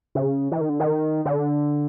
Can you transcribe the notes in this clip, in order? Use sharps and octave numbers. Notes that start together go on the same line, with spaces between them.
C#3
E3
D#3
D3
D#3
D3